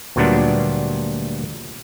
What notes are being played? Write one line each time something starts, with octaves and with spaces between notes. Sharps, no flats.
D2 A#2 F#3 G3 B3 D4